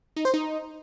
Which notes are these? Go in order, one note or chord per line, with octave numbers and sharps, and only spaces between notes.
D#4
C5
D#4